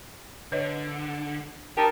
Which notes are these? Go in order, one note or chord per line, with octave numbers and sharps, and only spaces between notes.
D3 B4 C#5 D#5
D#4 G4 A#4 G5 A5